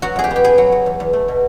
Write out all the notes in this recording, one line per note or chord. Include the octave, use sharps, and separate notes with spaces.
F#3 F#4
F2 G#4
G4
B3
G4
B3 G#4
F#3
F#3
E2
E2
A3
B2